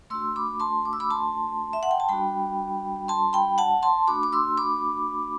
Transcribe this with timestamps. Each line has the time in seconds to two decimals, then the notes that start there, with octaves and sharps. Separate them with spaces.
0.10 A3 D4 F#4 C6 E6
0.36 B5 D6
0.60 A5 C6
0.85 D6
0.93 E6
1.00 B5 D6
1.11 A5 C6
1.73 E5
1.83 F#5
1.91 G5
2.00 A5
2.09 G3 D4 F#4 G5 B5
3.08 A5 C6
3.33 G5 B5
3.58 F#5 A5
3.83 A5 C6
4.07 A3 D4 F#4 B5 D6
4.23 D6
4.33 C6 E6
4.58 B5 D6